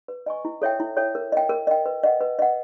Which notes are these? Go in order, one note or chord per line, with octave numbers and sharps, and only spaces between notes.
B4
D#5 G#5 C#6
E4
A4 C#5 E5 G5
E4
A4 C#5 E5 G5
A#4
D#5 G5
A#4
D#5 G5
B4
D#5 F#5
B4
D#5 F#5